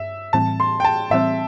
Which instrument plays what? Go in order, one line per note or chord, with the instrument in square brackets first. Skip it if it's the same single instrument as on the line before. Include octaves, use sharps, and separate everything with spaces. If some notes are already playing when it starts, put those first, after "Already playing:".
Already playing: [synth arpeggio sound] G2 [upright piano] E5
[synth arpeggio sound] A2 E3 G3 C4 [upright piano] A5
[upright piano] C6
G5
A5
[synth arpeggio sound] A2 E3 G3 C4 [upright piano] E5